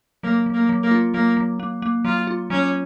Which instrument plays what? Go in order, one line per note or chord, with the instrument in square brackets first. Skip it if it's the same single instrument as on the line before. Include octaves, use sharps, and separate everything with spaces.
[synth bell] F#3 [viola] A#3
[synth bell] F#3
[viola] A#3
[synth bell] F#3
[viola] A#3
[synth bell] F4
[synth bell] F#3 [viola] A#3
[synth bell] F#3
A#3
A#3
[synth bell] F#3 [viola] F4
[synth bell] F4
[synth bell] F#3 [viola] C#4